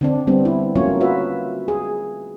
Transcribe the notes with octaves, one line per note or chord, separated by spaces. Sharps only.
D3 C4 D4
G3 B3 C4 D4
E4
F#3 A3 A#3 C#4 F4 C#5
F4 F#4 B4 E5
G#4